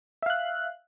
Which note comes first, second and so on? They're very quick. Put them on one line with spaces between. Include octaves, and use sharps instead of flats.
E5 F5 F#6